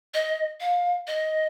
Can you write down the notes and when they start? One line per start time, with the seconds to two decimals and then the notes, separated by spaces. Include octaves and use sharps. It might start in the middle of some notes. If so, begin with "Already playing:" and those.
0.14 D#5
0.60 F5
1.07 D#5